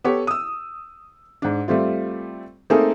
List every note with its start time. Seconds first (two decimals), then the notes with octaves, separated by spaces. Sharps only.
0.04 B3 G4 A4 C#5
0.27 D#6 E6
1.42 G#2 D4
1.68 G3 A3 C4 F4
2.70 A3 A#3 C4 D#4 G#4 A4